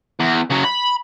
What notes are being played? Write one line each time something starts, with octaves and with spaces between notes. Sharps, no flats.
E2
C#3 F#3
B5